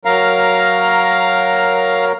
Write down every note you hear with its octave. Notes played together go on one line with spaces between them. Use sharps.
F#3 A#4 F5 A#5